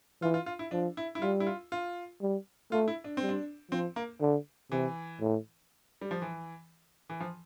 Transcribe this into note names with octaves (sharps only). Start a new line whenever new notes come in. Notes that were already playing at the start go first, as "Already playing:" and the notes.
E3 F4
F4
F4
E4
F3 D4
E4
E4
G3 F4
E4
F4
F4
G3
A3 F4
E4
D4
G3 C4
D4
F3 C4
A#3
D3
C3 E3
A2
G3
F3
E3
E3
F3